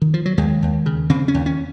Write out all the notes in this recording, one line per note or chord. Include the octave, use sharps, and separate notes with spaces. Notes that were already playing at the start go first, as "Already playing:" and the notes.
D#3
F3
F#3
D#2 G#3
D#2
C#3
C#3 C4
C#4
D#2
C#4